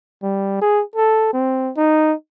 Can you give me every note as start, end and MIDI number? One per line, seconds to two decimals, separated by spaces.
0.23 0.60 55
0.61 0.82 68
0.96 1.29 69
1.33 1.72 60
1.77 2.13 63